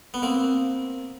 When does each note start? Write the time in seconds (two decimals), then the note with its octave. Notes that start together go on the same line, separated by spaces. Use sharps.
0.14 B3
0.22 A#3 C4